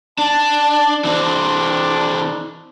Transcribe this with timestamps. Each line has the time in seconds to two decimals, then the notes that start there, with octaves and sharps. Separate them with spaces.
0.19 D4 A5
1.04 E3 C4 D4